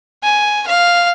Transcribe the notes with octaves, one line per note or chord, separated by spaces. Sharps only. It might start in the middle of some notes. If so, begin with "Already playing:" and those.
G#5
F5